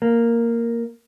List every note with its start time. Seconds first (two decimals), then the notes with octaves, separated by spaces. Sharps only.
0.02 A#3